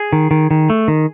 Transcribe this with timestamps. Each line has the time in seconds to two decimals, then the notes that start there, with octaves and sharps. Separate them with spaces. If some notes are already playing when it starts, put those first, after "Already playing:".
Already playing: G#4
0.13 D#3
0.31 D#3
0.51 D#3
0.70 A3
0.88 D#3